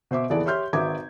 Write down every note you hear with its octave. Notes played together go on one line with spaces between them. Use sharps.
B2 C5 E5 D6
D#2 E3 B3 G#4 A4 D5
G4 C#5 E5 C6 F6 G6
G#1 F#4 B4 E5 D6 G#6